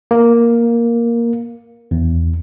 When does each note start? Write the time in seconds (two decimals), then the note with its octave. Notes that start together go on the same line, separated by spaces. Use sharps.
0.11 A#3
1.91 E2